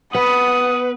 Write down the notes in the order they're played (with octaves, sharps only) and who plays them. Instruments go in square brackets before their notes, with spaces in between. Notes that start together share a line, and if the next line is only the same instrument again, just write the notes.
[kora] B3 [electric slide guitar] B4 [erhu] F#5 [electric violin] D#6